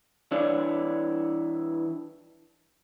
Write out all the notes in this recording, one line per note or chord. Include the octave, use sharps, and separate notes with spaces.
E3 D4 E4 C#5 D5